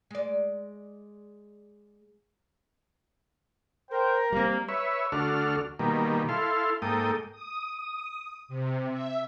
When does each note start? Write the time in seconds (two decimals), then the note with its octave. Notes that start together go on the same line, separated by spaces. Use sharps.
0.11 G#3 D5
3.91 A#4 C5 G5
4.32 G3 A#3 C4
4.68 B4 C#5 E5
5.12 D2 D4 F#4 A4 F6
5.79 B2 D#3 G3 A#3
6.29 E4 A4 F5 C6
6.82 G#2 A#3 A4 G5 D#6
7.32 D#6
8.48 C3
8.92 E5